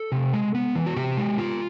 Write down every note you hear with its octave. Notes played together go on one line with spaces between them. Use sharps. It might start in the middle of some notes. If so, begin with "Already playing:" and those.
Already playing: A4
C3
G#3
B3
E3
F#4
C3 G4
G#3
B3 F4